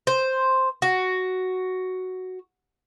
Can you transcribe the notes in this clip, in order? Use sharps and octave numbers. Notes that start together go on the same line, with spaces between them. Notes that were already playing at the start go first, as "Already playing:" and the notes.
C5
F#4